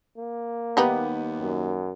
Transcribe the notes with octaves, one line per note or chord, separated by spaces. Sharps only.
A#3
D#2 G3 B3 D#4 G4 B4
F#2